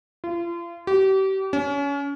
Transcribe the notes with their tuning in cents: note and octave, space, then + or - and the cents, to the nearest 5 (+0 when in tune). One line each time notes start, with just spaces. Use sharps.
F4 -35
G4 -35
C#4 +30